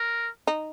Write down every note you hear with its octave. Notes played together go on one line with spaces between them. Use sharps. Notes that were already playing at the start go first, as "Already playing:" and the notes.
Already playing: A#4
D#4